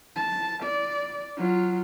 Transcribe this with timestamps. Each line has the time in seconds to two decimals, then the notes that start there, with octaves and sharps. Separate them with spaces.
0.16 A5
0.64 D5
1.37 F#3 F4